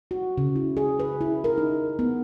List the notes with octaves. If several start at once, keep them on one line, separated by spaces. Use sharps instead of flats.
F#4
C#3
E4
G#4
B4
E4
A#4
D#4
B3